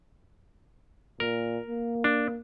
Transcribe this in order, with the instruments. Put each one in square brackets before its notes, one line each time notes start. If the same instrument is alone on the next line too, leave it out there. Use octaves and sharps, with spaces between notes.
[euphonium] A#2 [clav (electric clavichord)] A#4
[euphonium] A#3
[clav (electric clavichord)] D4